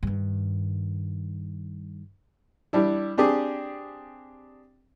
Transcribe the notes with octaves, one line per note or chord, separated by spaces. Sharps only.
G2 D#3
G3 D4 E4
C4 D4 G4 G#4